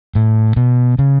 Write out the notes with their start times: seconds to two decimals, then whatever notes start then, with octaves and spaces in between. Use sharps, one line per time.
0.15 A2
0.56 B2
0.99 C#3